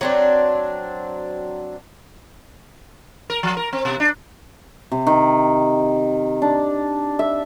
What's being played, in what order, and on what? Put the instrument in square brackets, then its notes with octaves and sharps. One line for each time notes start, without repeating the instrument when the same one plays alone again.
[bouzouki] F#3 C4 D4
[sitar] A#4
F3
A#4
C4
B2
D4
[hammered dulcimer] C3
D#3
D4
E5